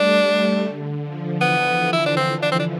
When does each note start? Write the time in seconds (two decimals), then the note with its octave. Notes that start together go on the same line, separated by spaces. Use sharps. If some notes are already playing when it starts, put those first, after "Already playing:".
Already playing: G3 A3 D4
0.26 G3
0.64 D3
1.03 F3
1.41 E3 B3
1.79 E3
1.93 E4
2.06 D4
2.17 C4
2.43 D4
2.52 C4
2.59 D4